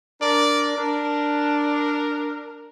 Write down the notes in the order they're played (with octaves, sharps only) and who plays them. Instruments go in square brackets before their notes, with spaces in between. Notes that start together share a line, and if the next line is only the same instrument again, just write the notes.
[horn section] D4 A#4 [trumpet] D5
[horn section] D4 [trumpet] A#4